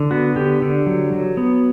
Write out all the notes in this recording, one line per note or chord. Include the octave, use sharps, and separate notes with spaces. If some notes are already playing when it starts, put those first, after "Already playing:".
Already playing: D3
B3 F#4
D3 G4
D3
F#3
F#3
B3